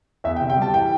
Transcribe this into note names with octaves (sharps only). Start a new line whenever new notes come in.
E2 E5
G5
C3
G5
G3 A5
E3 G5